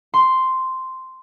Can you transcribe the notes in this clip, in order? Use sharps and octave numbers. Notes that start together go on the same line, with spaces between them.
C6